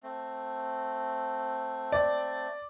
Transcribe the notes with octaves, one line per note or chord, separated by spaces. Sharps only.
A3 C4
D5